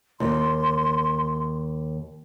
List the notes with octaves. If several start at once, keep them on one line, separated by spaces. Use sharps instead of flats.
D#2 C6